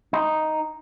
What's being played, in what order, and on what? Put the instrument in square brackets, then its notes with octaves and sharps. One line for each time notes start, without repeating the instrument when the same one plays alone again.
[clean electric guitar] D#4